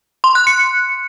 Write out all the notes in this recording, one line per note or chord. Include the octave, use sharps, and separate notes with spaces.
C6
F#6
C#7